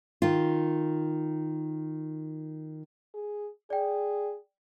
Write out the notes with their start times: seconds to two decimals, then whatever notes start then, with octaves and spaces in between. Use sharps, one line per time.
0.22 D#3 F4
3.14 G#4
3.70 G#4 D5 G5